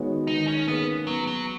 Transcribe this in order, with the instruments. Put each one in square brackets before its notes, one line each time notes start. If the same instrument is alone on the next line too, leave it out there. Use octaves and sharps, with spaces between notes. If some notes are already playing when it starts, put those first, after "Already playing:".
Already playing: [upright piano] D#3 G#3 B3 F#4 C#5
[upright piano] D#3 [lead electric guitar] D#4
[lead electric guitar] C#4
[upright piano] A#3 C#4 G#4 B4 [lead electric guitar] B3
[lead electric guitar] F#3 [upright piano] B3
[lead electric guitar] F#3